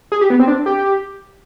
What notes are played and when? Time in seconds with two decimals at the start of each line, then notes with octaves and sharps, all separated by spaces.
0.12 G#4
0.21 G4
0.30 B3
0.39 C4
0.48 D4
0.66 G4